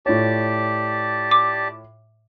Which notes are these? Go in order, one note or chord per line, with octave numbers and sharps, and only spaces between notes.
A2 F4 G4 C#5 D5 A5
D6